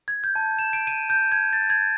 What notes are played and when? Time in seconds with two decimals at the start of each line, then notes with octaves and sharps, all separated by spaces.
0.08 G#6
0.24 G6
0.35 A5
0.59 E7
0.73 D7
0.87 D#7
1.10 G6
1.32 G#6
1.53 A6
1.70 G#6